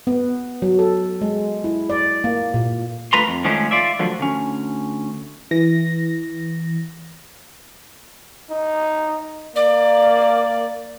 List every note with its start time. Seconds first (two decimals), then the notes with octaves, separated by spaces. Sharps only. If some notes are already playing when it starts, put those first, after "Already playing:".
0.07 B3
0.62 F#3
0.79 A4
1.22 G#3
1.64 E4
1.90 D5
2.24 A#3
2.54 A#2
3.13 D3 A3 F4 B4 A#5 C6
3.28 F2
3.44 D#3 F3 G#3 A3 C#4 D4
3.71 F4 D5 E5
3.99 D3 F3 F#3 A3
4.20 D2 C#4
5.51 E3 A#6
8.50 D#4
9.56 A#3 D5